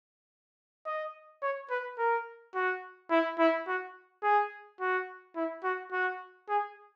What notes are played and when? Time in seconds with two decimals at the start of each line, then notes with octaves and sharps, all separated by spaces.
0.86 D#5
1.43 C#5
1.70 B4
1.98 A#4
2.55 F#4
3.11 E4
3.39 E4
3.67 F#4
4.23 G#4
4.80 F#4
5.36 E4
5.64 F#4
5.91 F#4
6.49 G#4